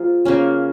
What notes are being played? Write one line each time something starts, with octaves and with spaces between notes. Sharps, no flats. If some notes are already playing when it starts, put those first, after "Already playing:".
Already playing: F3 A#3 F4 G#4
C#3 A#3 C#4